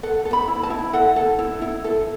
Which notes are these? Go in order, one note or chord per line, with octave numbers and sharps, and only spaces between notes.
A4 F#5
A4
B5
E4
A5
E4
A4 F#5
A4
E4
E4
A4